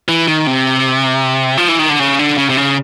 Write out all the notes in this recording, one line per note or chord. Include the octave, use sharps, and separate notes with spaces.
E3
D#3
C3
F3
E3
D#3
D3
C#3
D3
C#3
C3
C#3